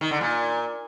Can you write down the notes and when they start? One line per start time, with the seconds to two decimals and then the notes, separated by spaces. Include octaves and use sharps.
0.01 D#3
0.11 D3
0.21 A#2